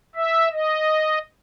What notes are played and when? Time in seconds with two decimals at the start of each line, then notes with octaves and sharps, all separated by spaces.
0.15 E5
0.52 D#5